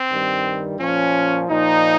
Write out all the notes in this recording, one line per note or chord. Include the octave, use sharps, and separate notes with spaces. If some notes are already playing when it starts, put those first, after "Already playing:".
Already playing: C4
G2 D#3 G3
A#2 F3 C#4
A#2 F3 D#4